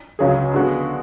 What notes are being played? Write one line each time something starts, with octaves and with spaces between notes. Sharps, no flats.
C#2 C#3 F#3 C#4 G#4
D3 G#3 B3 F#4